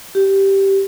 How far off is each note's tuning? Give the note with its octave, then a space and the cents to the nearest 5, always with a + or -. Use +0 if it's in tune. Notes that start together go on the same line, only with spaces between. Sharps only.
G4 -5